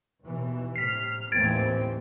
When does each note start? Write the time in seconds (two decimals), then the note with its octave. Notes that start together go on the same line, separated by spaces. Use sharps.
0.23 D#2 B2 E3
0.76 A2 C3 F6 B6 C7
1.32 G#1 D#2 A2 E3 C4 G#6 A6 D7